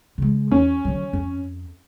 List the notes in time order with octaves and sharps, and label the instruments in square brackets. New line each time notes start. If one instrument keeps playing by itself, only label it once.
[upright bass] C#3 G#3
[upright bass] E2 [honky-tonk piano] C#4
[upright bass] D3 F#3
F2